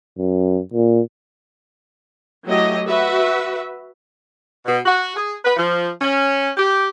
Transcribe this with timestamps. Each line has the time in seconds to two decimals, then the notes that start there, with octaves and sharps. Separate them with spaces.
0.18 F#2
0.73 A#2
2.46 F#3 A3 E4 G4 D#5
2.86 F#4 B4 E5
4.65 B2
4.85 F#4
5.16 G#4
5.44 B4
5.56 F3
6.01 C#4
6.57 G4